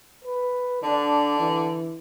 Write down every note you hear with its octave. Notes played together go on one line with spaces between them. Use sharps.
B4
D3 D4
E3